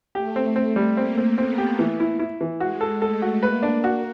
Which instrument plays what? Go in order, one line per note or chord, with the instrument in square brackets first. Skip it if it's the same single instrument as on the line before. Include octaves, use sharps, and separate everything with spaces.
[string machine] A3 [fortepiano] G4
[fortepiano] C4
[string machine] A3 [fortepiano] C4
[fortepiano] G3
[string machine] A#3 [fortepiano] C4
[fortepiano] C4
[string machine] B3 [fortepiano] C4
[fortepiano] G4
E3
E4
E4
E3
[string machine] G#3 [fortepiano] F#4
[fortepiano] A4
[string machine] A3 [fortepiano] A4
[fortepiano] F#4
[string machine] A#3 [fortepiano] B4
[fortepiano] D4
F#4